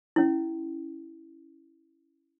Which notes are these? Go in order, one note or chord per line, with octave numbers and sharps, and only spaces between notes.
C#4 E4